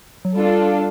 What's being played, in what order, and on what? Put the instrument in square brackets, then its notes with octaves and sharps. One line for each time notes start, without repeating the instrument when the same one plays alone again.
[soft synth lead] F#3
[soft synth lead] G3 [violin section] D4 F4 A4